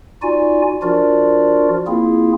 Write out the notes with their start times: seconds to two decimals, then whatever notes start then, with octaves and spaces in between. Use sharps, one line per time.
0.22 D#4 F4 F#4 D5 G#5
0.82 F3 D4 F4 F#4 A#4 D5
1.87 A#3 C4 E4 F4 G#4